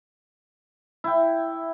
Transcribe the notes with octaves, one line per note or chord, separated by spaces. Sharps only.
E4 G5